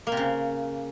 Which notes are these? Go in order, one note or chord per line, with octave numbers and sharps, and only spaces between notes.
A#3
C3
C#3